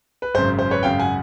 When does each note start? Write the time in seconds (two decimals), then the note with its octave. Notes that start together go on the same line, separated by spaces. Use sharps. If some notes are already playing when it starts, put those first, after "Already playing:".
0.22 B4
0.34 G#1 F#2 C#3 C5
0.59 C5
0.71 B4 C#5
0.83 G#1 F#2 C#3 F5 G5
1.00 F#5 G#5